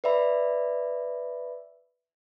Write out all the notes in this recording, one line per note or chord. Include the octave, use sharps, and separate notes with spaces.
B4 D5 E5 B5